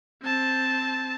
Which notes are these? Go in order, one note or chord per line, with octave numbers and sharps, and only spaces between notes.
C4 A5